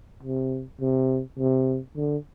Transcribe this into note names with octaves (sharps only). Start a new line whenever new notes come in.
C3
C3
C3
D3